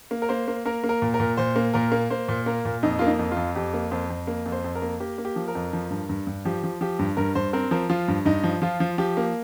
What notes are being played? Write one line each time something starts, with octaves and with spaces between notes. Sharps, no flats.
A#3
A#4
A#3 C5
A#3
A#3 A#4
A#3
A#4
A#2
A#4
A#2
A#2 C5
A#3
A#2 A#4
A#3
A#3 C5
A#2
A#3 A#4
A#2
F2 D#4
A#3 F4
D#4
F2
F4
F2
F2 G4
A#3
F2 C5
F2
A#3
F2
C5
F2
A#4
A#3
A#3 G4
A#3
G4
F3
A#4
F2
F3
G2
G2
G2
F3 G4
F3
F3 G4
G2
G2 A#4
G2 C5
C4 A#4
F3 A#4
F3 F4
G2
G2 D#4
F3
F3 F4
F3
F3 G4
A#3